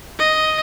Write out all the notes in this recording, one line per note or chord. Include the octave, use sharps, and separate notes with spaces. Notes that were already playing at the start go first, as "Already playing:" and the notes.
D#5